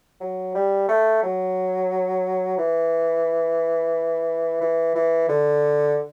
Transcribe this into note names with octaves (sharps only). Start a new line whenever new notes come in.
F#3
G3
A3
F#3
E3
E3
E3
D3